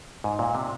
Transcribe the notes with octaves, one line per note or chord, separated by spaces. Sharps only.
G#2
A#2
C3